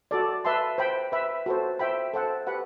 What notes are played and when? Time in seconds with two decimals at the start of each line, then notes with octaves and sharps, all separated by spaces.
0.11 F#4 A4 D5
0.45 B4 E5 A5 C6
0.78 C5 G5 B5
1.12 B4 E5 B5
1.46 F#4 A4 C5
1.79 C5 E5 G5 B5
2.14 A4 C5 F#5
2.47 G4 B4 F#5 B5